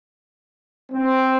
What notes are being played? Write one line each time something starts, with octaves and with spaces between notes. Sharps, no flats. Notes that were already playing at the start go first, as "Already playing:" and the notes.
C4